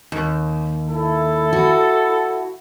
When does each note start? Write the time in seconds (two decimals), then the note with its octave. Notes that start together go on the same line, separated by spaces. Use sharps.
0.12 D#2
0.87 E4 A4
1.53 F#4